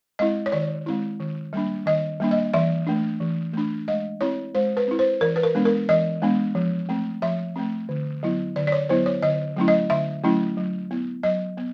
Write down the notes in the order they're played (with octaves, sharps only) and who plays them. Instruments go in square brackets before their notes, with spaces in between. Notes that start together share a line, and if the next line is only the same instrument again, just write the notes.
[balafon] G#3 C4 E4 D#5
C#5
D#3 D5
G#3 C4 E4
D#3
G3 A#3 D4
D#3 D#5
G3 A#3 D4
D#5
E3 E5
A3 D4
E3
A3 D4
G#3 D#5
C4 E4 C#5
G#3 C5
B4
C4 E4
C5
E3 A#4
B4
A#4
G#3 B3 D4
A#4
E3 D#5
G#3 B3 D4
F3
A3 C4
F3 E5
A3 C4
D3
F#3 B3 E4
D3 D5
D5
C#5
F#3 B3 E4 C5
C#5
D3 D#5
F#3 A3 C#4 E4
D#5
D3 E5
F#3 A3 C#4 E4
F#3
B3 E4
F#3 D#5
B3